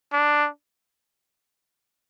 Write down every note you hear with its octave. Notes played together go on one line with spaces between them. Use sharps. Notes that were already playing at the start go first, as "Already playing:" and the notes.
D4